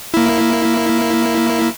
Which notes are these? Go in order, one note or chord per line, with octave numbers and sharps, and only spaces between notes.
A#3 E4